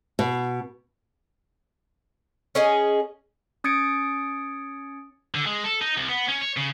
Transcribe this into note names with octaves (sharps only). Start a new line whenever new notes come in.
B2
C#4 G#4 D#5
C#4 D#6 G#6 A6 C#7 D7
D3
G#3
A4
D#4
C2
B3
C#4
C#5
C#3